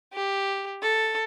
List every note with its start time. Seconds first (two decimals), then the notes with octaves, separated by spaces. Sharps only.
0.14 G4
0.82 A4